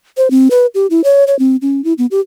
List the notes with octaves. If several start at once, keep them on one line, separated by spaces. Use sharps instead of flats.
C5
C4
B4
G4
E4
C#5
C#5
C4
C#4
E4
B3
G4